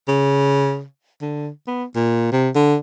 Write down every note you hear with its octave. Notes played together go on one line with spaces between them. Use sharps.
C#3
D3
B3
A#2
C3
D3